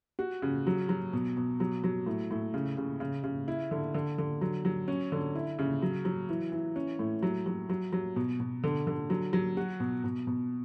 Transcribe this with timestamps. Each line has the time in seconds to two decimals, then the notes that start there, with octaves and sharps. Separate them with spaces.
0.19 F#4
0.42 C#3
0.67 F#3
0.89 F#3
1.13 B2
1.37 B2
1.60 F#3
1.84 F#3
2.06 A2
2.31 A2
2.54 C#3
2.77 C#3
3.00 C#3
3.24 C#3
3.48 E4
3.71 D3
3.94 D3
4.18 D3
4.41 F#3
4.65 F#3
4.88 C#4
5.12 D3
5.35 E4
5.59 C#3
5.82 F#3
6.05 F#3
6.29 E3
6.52 E3
6.76 C#4
6.99 A2
7.22 F#3
7.46 F#3
7.69 F#3
7.93 F#3
8.16 B2
8.40 B2
8.64 D3
8.87 D3
9.10 F#3
9.33 F#3
9.57 F#4
9.80 B2
10.04 B2
10.27 B2